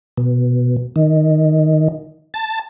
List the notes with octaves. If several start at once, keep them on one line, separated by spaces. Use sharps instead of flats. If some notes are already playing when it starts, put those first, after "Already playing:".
B2
D#3
A5